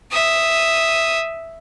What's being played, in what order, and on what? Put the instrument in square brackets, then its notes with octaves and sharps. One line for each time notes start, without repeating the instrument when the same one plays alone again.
[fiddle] E5 D#6